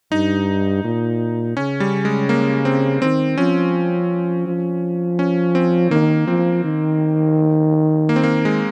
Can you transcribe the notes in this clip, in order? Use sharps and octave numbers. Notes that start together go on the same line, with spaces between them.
G2 D#4
A#2
C#3 C#4
G3
G#3
A#3
C4
D#3 C4
F3 C#4
F3
C#4
C4
D#3 A#3
F3 C4
D#3
A#3
C4
A#3
G#3